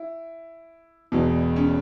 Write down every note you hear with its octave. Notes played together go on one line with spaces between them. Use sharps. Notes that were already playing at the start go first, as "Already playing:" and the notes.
Already playing: E4
E1 E2 B2
C#4